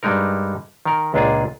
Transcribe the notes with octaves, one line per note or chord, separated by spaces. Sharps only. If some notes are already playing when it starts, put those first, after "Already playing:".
G2 G3 G#3 D#4 A#4
D#3 A#4
C#2 A#2 D4 F4 G#4